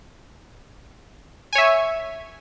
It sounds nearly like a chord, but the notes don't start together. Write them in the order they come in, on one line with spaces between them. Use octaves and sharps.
G#5 C#5 E5